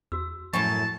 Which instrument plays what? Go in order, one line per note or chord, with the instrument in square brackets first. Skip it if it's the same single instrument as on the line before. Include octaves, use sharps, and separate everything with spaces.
[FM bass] E2 [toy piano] F#4 E6
[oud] F#2 A2 [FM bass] F3 [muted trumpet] A5 [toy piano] C#6